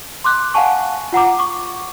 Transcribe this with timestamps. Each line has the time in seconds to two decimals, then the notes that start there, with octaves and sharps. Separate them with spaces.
0.24 C6 D6 F#6
0.54 F5 F#5 G#5 A5 C#6
1.12 F4 F#5 A#5 D6
1.39 C#6 D6